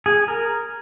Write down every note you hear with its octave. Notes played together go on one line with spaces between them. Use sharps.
G#4
A#4